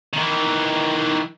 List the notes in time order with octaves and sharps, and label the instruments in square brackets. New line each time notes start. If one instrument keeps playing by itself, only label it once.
[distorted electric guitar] D#3 E3